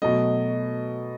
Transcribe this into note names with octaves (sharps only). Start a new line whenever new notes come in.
B2 F#3 A3 D#5